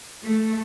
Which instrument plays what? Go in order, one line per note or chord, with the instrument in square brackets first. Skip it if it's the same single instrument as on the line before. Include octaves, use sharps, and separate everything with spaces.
[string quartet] A3